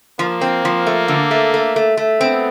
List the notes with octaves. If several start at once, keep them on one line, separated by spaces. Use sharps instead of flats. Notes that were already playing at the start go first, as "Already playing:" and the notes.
F3 A#3
C4
F3
A3
D3
A3
A3
A3
A3
B3 C4